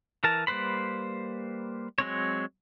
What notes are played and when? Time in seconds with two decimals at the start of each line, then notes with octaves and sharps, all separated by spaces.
0.24 E3 A#4 A5
0.47 G3 A#3 B4 C5 B5
1.98 F#3 G#3 C4 C#5